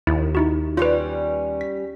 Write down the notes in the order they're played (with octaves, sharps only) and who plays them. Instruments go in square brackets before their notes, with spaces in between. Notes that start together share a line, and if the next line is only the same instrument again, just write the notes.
[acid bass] D#2 [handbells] E4
[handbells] D#4 E4 F#4
[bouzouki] G3 C#4 [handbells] F4 B4
[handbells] B6